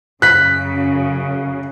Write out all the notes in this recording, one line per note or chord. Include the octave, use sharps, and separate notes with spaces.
F#2 C#3 F#6 B6